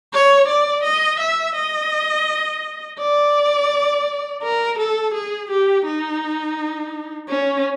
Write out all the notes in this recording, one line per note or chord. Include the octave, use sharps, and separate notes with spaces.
C#5
D5
D#5
E5
D#5
D5
A#4
A4
G#4
G4
D#4
C#4